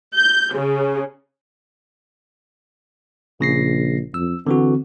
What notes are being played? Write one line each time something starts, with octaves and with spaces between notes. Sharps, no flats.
G6
C#3
A#1 C#3 A#6 C7
F2 E6
D3 E3 C4 F#4